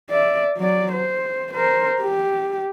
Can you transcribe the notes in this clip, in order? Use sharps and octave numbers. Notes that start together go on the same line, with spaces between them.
D5 E5
F#3 D5
C5
A#4 C5
G4